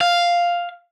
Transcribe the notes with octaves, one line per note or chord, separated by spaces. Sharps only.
F5